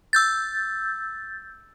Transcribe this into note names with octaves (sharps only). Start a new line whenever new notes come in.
E6 G6 A6